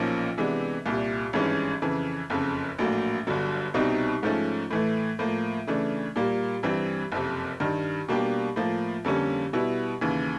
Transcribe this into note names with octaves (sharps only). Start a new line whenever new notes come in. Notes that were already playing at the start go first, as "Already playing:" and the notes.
Already playing: B1 A#2 F3 A#3 C#4
C3 E3 G#3 B3 D4
C2 A#2 G3
G#1 G2 E3 G#3 C#4
F2 C#3 E3
F#1 F2 C#3
A#1 A2 F#3 A#3
G1 G2 D3 F#3
C2 B2 G3 C4 D#4
G#2 F3 A3 C#4
A2 E3 A3
A2 F3 A#3
C#3 E3 A3 D4
A#2 G3 A#3
G2 E3 G3 C4
F#1 F2 C3
G2 D#3 G3
B2 G3 A#3 D4 G4
A2 F3 A#3
F2 D3 G3 A#3 C#4
B2 G3 B3 E4
D#2 C#3 E3